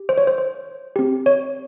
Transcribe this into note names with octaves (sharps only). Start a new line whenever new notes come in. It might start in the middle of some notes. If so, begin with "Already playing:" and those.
Already playing: G4
C5
C#5
C5
C5
C4 G4
C#5